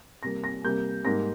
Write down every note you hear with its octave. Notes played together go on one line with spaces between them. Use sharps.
C3 G3 A#3 A#6
A#6
C3 G3 A#3 G6
G#2 G3 A#3 A#6